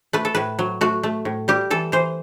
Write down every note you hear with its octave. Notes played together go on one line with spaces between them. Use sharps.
A3 B4
A4
A2 B4
F#3
A3 F#4
A3
A2
G3 G4
E3 A4
E3 C5